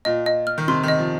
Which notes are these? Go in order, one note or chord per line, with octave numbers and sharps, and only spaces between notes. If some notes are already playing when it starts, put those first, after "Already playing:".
A#2 D#5
D#5
F6
D#3
C3 C6
D#3 D#5
F3